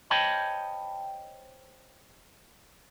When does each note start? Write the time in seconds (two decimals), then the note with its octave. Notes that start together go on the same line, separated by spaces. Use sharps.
0.10 C5 C#5 D#5 G5 A5 B5